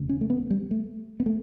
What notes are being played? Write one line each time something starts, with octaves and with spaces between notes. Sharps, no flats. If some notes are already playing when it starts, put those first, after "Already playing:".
Already playing: E1 D2 C#3
C#4
A3
B3
G3
A3
B3
A3